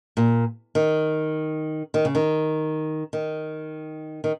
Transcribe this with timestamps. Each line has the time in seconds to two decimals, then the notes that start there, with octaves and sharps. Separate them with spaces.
0.17 A#2
0.75 D#3
1.94 D#3
2.05 C#3
2.15 D#3
3.13 D#3
4.24 D#3